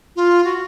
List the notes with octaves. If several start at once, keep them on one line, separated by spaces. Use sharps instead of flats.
F4
F#4